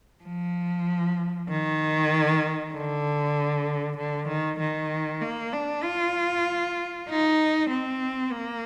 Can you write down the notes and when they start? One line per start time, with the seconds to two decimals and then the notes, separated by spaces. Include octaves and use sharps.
0.24 F3
1.49 D#3
2.72 D3
3.97 D3
4.28 D#3
4.60 D#3
5.21 A#3
5.53 D4
5.83 F4
7.09 D#4
7.70 C4
8.32 A#3